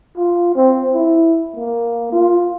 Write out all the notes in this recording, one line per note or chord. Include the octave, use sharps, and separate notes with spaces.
F4
C4
E4
A#3
F4